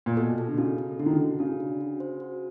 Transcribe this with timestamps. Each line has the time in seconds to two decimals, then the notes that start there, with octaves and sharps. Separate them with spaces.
0.06 A#2
0.17 B2 A4
0.38 A4
0.48 D3
0.58 C#3 F#4
0.78 A4
0.99 D3 F#4
1.06 D#3
1.13 D3
1.19 F#4
1.39 C#3 F#4
1.60 D4
1.81 F#4
2.00 C5
2.20 F#4